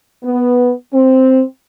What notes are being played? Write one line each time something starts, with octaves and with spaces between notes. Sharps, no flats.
B3
C4